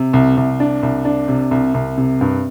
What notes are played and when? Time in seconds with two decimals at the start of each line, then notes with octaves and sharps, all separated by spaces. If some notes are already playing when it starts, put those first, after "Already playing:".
Already playing: C3
0.13 C2
0.37 C2
0.60 D4
0.83 C2
1.05 D4
1.28 C3
1.51 C2
1.74 C2
1.98 C3
2.21 G2